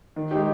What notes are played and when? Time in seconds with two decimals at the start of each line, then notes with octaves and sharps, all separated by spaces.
0.16 D#3
0.31 G#3 D#4 G4